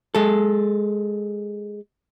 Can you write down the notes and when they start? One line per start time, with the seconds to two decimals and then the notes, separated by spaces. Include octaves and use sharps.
0.15 G#3 A4